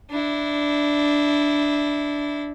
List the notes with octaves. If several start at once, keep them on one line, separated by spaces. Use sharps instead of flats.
D4 E4